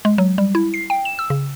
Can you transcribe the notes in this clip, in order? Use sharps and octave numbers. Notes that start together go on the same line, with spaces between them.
G#3
F#3
G3
E4
C7
G5
E7
E6
C#3